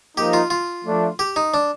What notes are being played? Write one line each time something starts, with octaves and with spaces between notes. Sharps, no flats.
F3 A#3 D#4 G4
F4
F4
F3 A3 D4
G4
D#4
D4